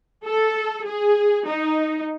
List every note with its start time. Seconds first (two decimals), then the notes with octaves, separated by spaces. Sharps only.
0.25 A4
0.85 G#4
1.46 D#4